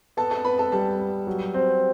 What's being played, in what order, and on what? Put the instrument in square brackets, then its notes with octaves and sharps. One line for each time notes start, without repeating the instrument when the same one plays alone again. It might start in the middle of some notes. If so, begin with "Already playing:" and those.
[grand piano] B3 [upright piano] A4 A5
[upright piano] A4 A5
[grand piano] B3 [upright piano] B4 B5
[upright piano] A4 A5
[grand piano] G3 [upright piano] A4 A5
[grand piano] B3
F#3
C4